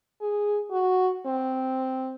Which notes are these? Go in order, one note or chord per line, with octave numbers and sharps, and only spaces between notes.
G#4
F#4
C4